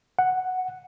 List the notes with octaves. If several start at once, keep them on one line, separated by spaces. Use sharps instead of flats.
F#5